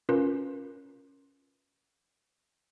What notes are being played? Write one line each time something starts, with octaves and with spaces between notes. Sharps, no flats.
C#4 F4 A#4 B4